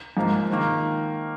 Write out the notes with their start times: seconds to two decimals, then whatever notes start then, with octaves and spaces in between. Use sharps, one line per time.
0.17 G#2 F3 A#3
0.52 D#3 A#3